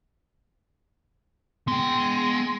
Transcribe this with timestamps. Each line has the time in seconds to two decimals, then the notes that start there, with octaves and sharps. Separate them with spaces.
1.68 G#3 B3 G5